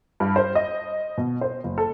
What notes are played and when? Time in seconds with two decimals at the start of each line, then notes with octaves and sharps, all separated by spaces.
0.20 G2
0.36 C5
0.55 D#5
1.18 B2
1.41 C5
1.64 F#1
1.78 A4